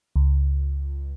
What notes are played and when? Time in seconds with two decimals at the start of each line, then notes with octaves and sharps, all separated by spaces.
0.16 C#2